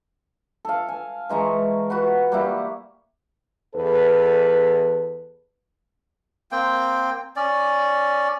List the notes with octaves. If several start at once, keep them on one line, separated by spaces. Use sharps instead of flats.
A4 F5
G#5
E3 G#3 A#5 C#6
F#4 B4 F#5
G3 A#3 E4 G4
E2 A4 B4
A#3 C4 G5
C#4 D5